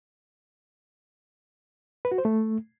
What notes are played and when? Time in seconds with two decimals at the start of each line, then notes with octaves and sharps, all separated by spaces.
2.05 B4
2.12 F#4
2.18 C5
2.25 A3